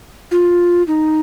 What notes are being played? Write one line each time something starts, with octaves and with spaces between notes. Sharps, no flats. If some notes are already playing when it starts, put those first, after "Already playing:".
F4
D#4